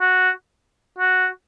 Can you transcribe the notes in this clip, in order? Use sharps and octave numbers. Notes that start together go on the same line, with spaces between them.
F#4
F#4